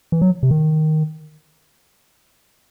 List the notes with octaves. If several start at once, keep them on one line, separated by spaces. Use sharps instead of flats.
E3
F#3
C3
D#3